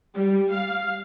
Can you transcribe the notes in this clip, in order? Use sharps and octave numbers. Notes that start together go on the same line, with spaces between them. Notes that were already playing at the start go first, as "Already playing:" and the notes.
G3
F5